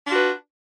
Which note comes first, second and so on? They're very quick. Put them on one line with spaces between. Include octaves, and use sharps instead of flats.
D4 F4 F#4 B4